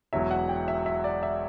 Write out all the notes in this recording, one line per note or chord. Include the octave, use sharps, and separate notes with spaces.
E1 E2 B2 F#3 E5
F#5
G5
E5
E5
D5
E5